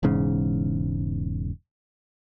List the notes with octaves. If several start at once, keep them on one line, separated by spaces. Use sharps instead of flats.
E1 E2 G#2 C#3